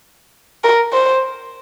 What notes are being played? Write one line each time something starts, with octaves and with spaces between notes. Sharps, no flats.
A#4
C5